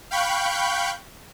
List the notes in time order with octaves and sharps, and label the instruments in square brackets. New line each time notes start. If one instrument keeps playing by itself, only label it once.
[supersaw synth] F5 G5 B5 C#6 F#6 G6